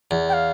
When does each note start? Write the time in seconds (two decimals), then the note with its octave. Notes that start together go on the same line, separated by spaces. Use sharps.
0.11 E2
0.29 G5
0.33 F5